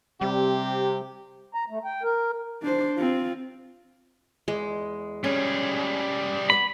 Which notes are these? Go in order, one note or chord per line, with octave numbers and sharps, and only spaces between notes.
C3 G3 G4
A#5
A3
G5
A#4
D4 C5
C4 F4
E2 G#3 D5 D#5
G3 C#4 G#4
B3 D5 B5